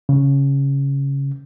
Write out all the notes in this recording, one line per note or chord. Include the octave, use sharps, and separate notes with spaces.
C#3